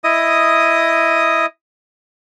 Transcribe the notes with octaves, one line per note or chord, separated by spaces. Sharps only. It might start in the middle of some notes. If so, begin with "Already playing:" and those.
E4 D#5 D#6